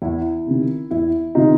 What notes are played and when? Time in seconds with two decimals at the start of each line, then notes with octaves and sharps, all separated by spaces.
0.02 E2 E4
0.47 C3 D#3
0.91 E2 E4
1.35 C3 D#3 D#4 F4